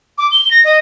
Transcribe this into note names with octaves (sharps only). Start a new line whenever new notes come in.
D6
G7
A#6
D#5